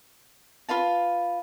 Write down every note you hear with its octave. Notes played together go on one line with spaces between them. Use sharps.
F4 B4 F5 A5